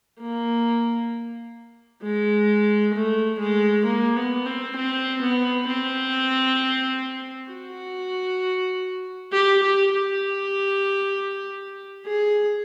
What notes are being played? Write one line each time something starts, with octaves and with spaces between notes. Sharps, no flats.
A#3
G#3
A3
G#3
A#3
B3
C4
C4
B3
C4
F#4
G4
G4
G4
G#4